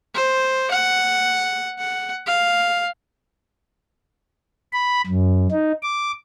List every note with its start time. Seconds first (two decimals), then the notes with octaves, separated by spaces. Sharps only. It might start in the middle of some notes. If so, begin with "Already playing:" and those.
0.15 C5
0.71 F#5
1.78 F#5
2.27 F5
4.73 B5
5.07 F#2
5.51 D#4
5.83 D6